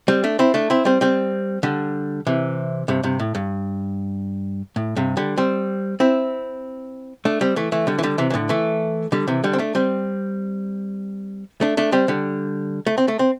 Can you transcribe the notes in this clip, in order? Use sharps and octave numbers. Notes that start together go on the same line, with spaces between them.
G3 C4
A3 D4
C4 E4
A3 D4
C4 E4
G3 C4
G3 C4
D3 G3
C3 E3
G2 C3
G2 C3
A2
G2
A2
G2 C3
D3 G3
G3 C4
C4 E4
A3 D4
G3 C4
E3 A3
E3 A3
D3 G3
E3
D3 G3
C3 E3
E3
A2 D3
E3 A3
D3 G3
C3 E3
D3 G3
C4
A3 D4
G3 C4
A3 D4
A3 D4
G3 C4
D3 G3
A3
C4
A3
C4